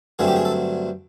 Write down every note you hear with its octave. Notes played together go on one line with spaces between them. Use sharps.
G2 D3 F#3 A3 C4 G#4
G4
G#4
A4